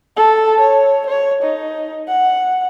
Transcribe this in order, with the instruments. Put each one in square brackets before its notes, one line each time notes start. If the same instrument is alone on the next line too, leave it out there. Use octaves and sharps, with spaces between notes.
[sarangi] A4
C#5
C#5
D#4
F#5